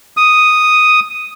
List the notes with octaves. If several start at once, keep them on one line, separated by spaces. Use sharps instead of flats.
D#6